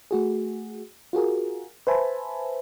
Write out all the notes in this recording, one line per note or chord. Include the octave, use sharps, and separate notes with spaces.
A3 F#4 G#4
F4 F#4 G#4 A#4
B4 C5 E5 G#5 A5 B5